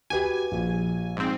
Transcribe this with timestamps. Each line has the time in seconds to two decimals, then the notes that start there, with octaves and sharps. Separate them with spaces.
0.10 F#4 G4 B4 G#5
0.52 A#1
1.17 G#2 C4